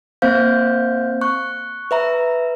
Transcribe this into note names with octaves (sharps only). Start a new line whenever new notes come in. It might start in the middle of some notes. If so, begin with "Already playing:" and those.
A#3 C4 C5 F5 G6
C#6 F#6
B4 E5 A#5